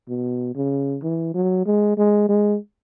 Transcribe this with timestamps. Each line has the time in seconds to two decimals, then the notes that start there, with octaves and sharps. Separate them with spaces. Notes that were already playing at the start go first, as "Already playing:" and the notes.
0.09 B2
0.55 C#3
1.03 E3
1.34 F#3
1.66 G#3
1.97 G#3
2.29 G#3